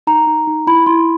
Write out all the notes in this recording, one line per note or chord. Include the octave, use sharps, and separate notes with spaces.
D#4 A#5
D#4
D#4
E4 B5
E4 C6